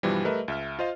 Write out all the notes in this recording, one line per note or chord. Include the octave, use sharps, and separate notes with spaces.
G2 B2 E3 F3 G3
G3 A3 A#4 B4 D#5 E5
C#2 E5 F6
F4 C5 D#5 F5